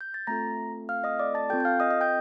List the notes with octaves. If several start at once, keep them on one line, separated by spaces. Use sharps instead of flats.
G6
A6
A3 C4 F4 A4 A#5 A#6
F5 F6
D#5 D#6
D5 D6
A5 A6
C4 F4 A4 G5 G6
G6
F5 F6
D#5 D#6
D#5 D#6
G5 G6